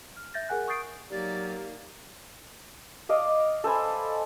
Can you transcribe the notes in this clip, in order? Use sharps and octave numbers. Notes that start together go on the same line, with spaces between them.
F6
E5 G6 A6 A#6
G#4 A#4 F#5 G#5 F#6
C#6 D#6 G6 A6 C7 D7
F#3 A#3 D#4 G4 D5
D5 D#5 F5
A4 C5 G#5 B5